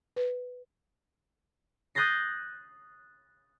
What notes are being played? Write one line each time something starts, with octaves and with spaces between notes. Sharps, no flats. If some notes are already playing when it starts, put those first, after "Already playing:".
B4
D#6 F#6 G6 A6 A#6 C7